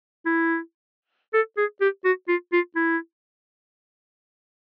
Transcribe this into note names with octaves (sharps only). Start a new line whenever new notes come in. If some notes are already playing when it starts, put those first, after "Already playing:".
E4
A4
G#4
G4
F#4
F4
F4
E4